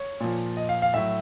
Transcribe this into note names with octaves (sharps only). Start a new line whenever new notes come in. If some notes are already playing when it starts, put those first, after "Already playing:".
Already playing: C#5
A#2 F3
D#5
F5
F5
A2 F#3 E5